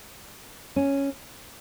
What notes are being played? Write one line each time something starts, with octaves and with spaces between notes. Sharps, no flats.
C#4